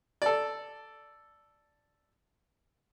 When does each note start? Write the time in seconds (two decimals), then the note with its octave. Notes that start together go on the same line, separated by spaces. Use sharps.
0.22 A4 D5